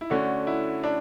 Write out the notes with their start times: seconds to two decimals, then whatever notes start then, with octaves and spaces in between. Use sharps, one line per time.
0.01 E4
0.10 D3 A3 C#4 D4 F#4
0.47 E4
0.84 D4